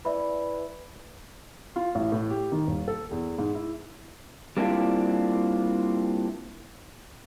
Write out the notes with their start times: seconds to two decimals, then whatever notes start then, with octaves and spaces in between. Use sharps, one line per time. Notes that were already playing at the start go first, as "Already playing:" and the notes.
0.05 E3 D5 E5 B5
1.76 F4
1.95 A1
2.12 A2
2.30 G4
2.52 D#3
2.67 D#1
2.88 A4
3.11 E2
3.38 G#2
3.55 E4
4.57 G3 A#3 C4 D4 E4 F4